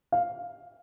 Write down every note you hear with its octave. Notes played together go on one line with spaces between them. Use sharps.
F5